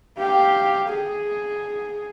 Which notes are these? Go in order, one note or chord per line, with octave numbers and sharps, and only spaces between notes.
G4 F5
G#4